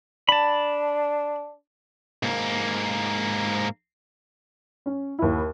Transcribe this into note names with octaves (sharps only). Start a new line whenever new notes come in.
D4 A5 B5
G#2 A#3
C#4
D#2 E4